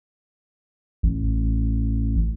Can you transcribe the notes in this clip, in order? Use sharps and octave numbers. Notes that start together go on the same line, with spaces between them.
A1